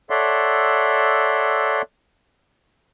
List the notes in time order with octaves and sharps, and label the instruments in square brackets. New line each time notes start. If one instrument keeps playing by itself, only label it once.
[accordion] A4 C#5 D5 E5 F#5 C6